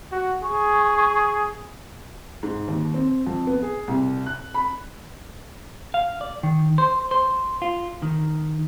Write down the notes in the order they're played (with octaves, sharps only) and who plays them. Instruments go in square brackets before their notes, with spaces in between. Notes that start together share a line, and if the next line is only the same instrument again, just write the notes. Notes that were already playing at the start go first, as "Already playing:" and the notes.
[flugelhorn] F#4
[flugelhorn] G#4 [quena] C#6
[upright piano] G#2
D#2
C4
F2
B3
G#4
C2
F#6
B5
[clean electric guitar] F5
D5
D#3
C5
C5
F4
D#3